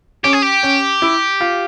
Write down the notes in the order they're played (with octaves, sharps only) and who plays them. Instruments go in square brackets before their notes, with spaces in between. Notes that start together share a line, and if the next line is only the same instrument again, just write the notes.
[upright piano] C#4 [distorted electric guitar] G4
[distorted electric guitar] G#4
G4
[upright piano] C#4
E4
F4